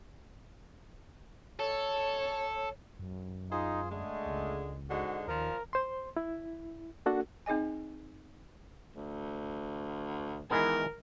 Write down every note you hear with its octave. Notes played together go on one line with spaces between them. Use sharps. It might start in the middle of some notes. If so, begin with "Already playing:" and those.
A4 C#5
F#2
D#4 F4 G#4 C5
D3 G#3 A3
C#2
G#2 D3 G#3 F#4
D#2 A#2 F3 A#4
C5 C6
E4
A#3 D4 F#4 A4 F#5
C4 D#4 G#4 D#5 G#5
D2
D#3 E3 G#3 B3 A#4